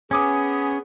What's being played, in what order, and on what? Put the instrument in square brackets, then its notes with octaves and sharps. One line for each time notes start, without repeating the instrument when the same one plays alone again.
[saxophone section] B3 G#4 [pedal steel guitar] C#4 [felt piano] G#5 D6 D#6